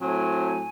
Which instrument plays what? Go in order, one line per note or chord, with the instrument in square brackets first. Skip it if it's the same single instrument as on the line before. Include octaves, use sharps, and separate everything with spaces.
[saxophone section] A2 F#3 A3 C4 [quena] G#5